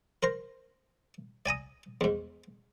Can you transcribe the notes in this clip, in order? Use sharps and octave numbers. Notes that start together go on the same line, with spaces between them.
A#4 C5 A#5
D5 G#5 A#5 D#6
E2 G#2